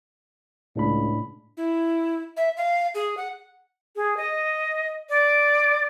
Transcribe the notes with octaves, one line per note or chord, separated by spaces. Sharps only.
C#2 A2 D4 B5
E4
E5
F5
G#4
F#5
G#4
D#5
D5